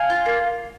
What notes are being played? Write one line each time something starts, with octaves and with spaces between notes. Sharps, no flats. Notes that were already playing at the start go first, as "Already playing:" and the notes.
Already playing: F5 G#5
F4
A#3